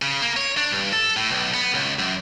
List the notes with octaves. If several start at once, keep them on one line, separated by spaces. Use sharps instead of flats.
C#3
A#3
C#5
D4
G2
A4
A2
B1
B3
C#2
F#2